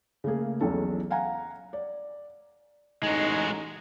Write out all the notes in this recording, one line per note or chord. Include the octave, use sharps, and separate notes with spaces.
C#3 A3 A#3 G#4
B1 E2 C#4 A4
F5 F#5 G#5 A#5
D5
A1 G#3 D#4 F#4